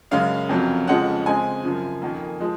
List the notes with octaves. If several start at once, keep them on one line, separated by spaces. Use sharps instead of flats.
F#2 C#3 G#3 C#4 F5
F2 C3 F#3 C#4
F2 C#3 F3 G#3 C#4 F#5
C#3 G#3 C4 G#5
F#2 C#3 F3
F2 D#3 A#3
F3 G#3